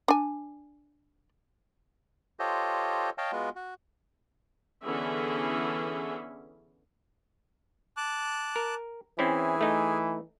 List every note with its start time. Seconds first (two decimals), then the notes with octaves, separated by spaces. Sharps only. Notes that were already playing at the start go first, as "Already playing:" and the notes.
0.08 D4 G#5
2.39 F4 G4 A4 C5 C#5 D#5
3.18 C#5 D#5 F5 G5 A5
3.32 G#3 B3 F4 F#4
3.56 F#4
4.84 D3 E3 B3 C#4 G#4 E5
7.97 A5 D6 F#6
8.56 A#4
9.19 E3 C4 C#4 E4 G#4
9.61 A3 D#4